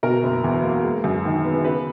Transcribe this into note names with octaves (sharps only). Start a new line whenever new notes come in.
B2 A#4
F#1
E2
A#3
G#3
F#2
D#3
B3
C#3 B4